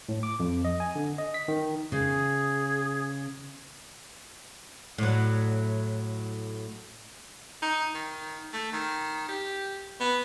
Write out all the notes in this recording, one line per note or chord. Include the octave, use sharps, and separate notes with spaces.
A2
D6
F2
D#5
G#5
D3
D#5
B6
D#3
C#3 G#4
A2 F#3
D#4
D#3
A3
D#3
G4
B3